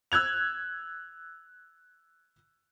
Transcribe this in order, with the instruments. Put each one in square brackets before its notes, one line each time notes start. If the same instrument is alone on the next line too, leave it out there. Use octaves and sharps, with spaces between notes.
[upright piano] E6 F#6 G#6 F7